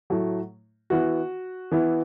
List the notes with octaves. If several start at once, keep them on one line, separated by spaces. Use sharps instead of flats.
A2 F#3 A3 E4
E3 B3 E4 F#4
E3 B3 E4